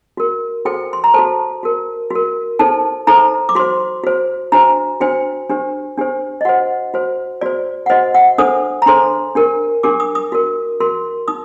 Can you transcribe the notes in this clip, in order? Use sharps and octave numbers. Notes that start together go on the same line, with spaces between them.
F#4 A#4
F#4 A4 C5 G5
C6
A#5
F#4 A4 C5 A5
F#4 A#4
F#4 A#4
D#4 A4 C5 A5
D#4 A4 C5 A#5
D6
F#4 C5 C6
F#4 C5
D4 F#4 C5 A#5
D4 F#4 C5 G5
D4 G4 C5
D4 G4 C5
D#5
F#4 C5 F#5
F#4 C5
F#4 C5 D5
F#5
F#4 C5 D#5
F#5
D4 A4 C5 D#6
A#5
D4 A4 C5 C6
D4 G4 A#4
D4 G4 A#4 D6
D#6
D#6
F#4 A#4
F#4 A#4 C6
D#4 D#6